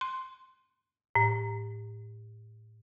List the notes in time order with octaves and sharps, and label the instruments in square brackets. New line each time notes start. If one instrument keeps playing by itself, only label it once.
[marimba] C6
A2